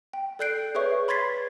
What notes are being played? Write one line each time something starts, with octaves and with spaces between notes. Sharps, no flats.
G5
A4 D5 F#6 G6 C7 D7
G#4 B4 C#5 E5 C#6
B5 C6 G#6 A6 B6 C7